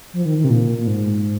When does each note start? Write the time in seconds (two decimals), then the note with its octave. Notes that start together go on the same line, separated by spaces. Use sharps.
0.13 F3
0.25 D#3
0.38 D#3
0.44 C3
0.50 A#2
0.78 A#2
0.87 G#2